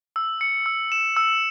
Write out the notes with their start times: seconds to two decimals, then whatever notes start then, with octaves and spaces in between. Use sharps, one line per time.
0.16 E6
0.41 C#7
0.66 E6
0.92 E7
1.17 E6